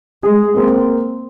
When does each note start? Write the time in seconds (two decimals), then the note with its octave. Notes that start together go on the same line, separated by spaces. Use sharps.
0.23 G#3 G#4
0.57 A#3 C4